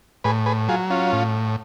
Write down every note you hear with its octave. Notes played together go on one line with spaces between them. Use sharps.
A2 G#4 B4
G#4 B4
F#3 F4 G#4
C#4 F4
A2